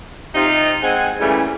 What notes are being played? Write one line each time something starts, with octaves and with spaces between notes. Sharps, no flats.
C3 D#4 F4
G#3 C4 F#5 G#5
C#3 E3 G3 A3 A#3